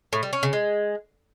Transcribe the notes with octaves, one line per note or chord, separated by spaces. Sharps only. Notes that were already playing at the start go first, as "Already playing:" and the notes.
A2
G3
C#4
C#3
G#3